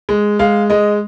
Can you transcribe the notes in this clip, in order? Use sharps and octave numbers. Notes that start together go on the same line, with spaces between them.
G#3
G#3 F5
G#3 D#5